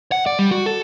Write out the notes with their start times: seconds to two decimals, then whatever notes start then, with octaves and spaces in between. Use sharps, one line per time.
0.12 F#5
0.26 D5
0.39 G3
0.51 F#4
0.66 A4